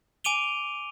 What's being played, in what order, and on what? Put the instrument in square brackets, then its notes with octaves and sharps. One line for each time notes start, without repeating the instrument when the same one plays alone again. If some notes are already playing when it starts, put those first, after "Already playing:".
[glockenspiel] G#5 D6 D7 D#7 F7 G7